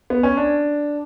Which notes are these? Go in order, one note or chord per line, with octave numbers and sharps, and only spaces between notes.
B3
C#4
D4